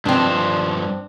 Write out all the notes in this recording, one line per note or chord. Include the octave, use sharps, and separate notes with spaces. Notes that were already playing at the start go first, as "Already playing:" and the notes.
G2 F3 C4 D4